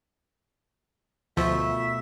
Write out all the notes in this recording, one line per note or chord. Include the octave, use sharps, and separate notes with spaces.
D2 B2 F3 A3 F4 E5 C#6